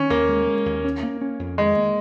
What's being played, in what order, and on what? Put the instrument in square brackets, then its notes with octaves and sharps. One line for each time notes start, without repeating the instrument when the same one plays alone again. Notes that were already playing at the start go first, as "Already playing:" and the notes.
Already playing: [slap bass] D#3 [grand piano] C#4
[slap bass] D#2 [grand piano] A#3
[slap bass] G#3
G#3
D#2
C#4
A#3
C#4
F2
[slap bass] D#3 [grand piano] G#3
[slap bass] A#3